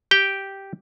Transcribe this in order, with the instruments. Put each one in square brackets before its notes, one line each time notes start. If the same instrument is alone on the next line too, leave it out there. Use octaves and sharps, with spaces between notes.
[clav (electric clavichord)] G4 G5